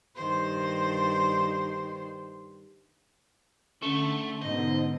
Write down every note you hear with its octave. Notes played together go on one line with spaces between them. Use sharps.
G2 D#3 C5
D3 A3 C#4
G#2 B2 D3 D#4 C5 D#5